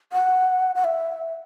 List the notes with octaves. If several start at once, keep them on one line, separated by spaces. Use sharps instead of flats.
F#5
F#5
E5